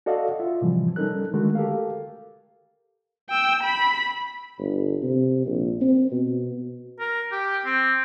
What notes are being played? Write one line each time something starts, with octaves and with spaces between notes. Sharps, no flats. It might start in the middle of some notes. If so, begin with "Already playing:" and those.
F#4 A4 D5 D#5 F5 F#5
F4 E5
A2 C3 E3 F3 G3
G3 C#4 D#4 A4 A#4 F#6
D3 D#3 G#3 A3 F#4 A#4
G4 A4 A#4 F5
G5 E6
B5
G1
C3
A#1
C4
B2
A#4
G4
C4